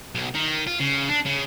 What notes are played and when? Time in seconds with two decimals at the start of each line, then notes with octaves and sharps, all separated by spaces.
0.15 B1
0.35 D#3
0.67 F4
0.81 C#3
1.09 D4
1.26 C#3